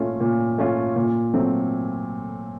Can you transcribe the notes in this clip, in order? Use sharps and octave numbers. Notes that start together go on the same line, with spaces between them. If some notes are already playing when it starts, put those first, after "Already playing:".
Already playing: A#2 A3 C#4 F4
A#2
A3 C#4 F4
A#2
F#3 A3 C4